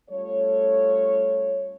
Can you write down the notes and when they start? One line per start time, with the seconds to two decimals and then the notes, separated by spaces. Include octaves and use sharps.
0.10 G3 A3 C#4 F4 A4 C#5